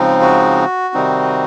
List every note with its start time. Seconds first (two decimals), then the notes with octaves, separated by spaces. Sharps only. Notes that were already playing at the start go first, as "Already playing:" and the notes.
Already playing: C#3 F3 G#3 C4 D#4
0.22 F#4
0.94 C3 D#3 G3 C4 D#4